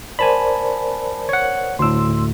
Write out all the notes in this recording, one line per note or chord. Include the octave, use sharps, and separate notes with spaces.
A#4 C5 D5 G#5 A5 B5
C#5 F#5
D2 A2 C6 E6